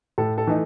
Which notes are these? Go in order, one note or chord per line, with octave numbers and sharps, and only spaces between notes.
A2 A4
A4
E3 A3 D#4